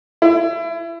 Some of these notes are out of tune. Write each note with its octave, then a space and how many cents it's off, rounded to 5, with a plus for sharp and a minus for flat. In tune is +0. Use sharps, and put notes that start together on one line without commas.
E4 +30